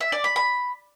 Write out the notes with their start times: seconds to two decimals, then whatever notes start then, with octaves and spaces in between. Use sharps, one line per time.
0.01 E5
0.12 D5
0.24 B5
0.36 B5